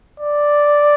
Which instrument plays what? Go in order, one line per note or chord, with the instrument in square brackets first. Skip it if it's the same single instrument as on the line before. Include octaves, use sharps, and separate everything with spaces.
[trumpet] D5